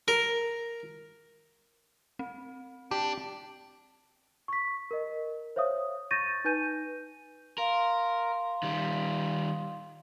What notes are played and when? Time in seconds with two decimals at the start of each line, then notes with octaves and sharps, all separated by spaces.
0.08 A#4
2.19 C4
2.91 D4 G4
4.48 C#6 B6
4.91 A#4 D#5
5.56 C5 C#5 E5 F5 D#6
6.11 C#6 G6 A6 A#6 D#7
6.45 D#4 B4 G#5 G6 D#7
7.58 A#4 F5 C6
8.63 D#3 G3